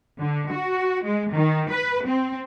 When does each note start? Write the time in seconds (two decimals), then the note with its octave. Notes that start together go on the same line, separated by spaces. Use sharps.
0.20 D3
0.52 F#4
1.03 G#3
1.33 D#3
1.70 B4
2.05 C4